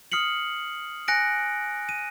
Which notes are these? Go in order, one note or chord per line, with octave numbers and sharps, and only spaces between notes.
D#6 F6 C7 C#7 F#7
G#5 F#6 A#6 C#7 D7
D#7